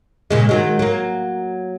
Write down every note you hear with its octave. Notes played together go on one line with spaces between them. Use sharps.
A#2 C#3 G#3
D#3 F#3 G#3
F#3 A#3